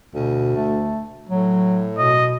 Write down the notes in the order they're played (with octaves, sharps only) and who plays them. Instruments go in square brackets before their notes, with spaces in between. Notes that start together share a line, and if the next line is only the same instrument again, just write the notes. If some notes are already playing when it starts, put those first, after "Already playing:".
[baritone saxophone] D2 [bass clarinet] B2
[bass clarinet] A3
[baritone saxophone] A2 [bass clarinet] F#3
[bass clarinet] B2 [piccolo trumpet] D#5